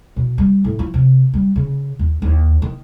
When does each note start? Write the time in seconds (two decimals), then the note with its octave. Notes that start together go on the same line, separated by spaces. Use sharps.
0.16 B2
0.38 G3
0.64 A2
0.79 F3
0.94 C3
1.34 G3
1.56 C#3
1.99 D#2
2.22 D#2
2.62 D#3